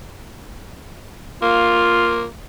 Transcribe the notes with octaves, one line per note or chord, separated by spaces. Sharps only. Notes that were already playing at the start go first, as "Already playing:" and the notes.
A#3 F4